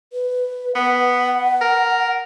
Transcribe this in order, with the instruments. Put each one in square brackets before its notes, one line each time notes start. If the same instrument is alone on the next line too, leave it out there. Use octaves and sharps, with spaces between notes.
[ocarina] B4
[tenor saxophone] B3 [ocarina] F#5
[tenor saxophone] A#4